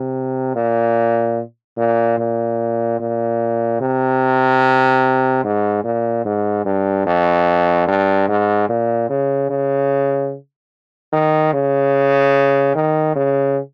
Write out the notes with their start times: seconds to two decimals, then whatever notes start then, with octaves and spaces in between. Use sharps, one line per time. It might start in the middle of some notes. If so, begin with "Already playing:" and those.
Already playing: C3
0.56 A#2
1.77 A#2
2.19 A#2
3.00 A#2
3.81 C3
5.44 G#2
5.84 A#2
6.25 G#2
6.65 G2
7.06 F2
7.87 G2
8.28 G#2
8.69 A#2
9.10 C#3
9.50 C#3
11.13 D#3
11.53 C#3
12.75 D#3
13.16 C#3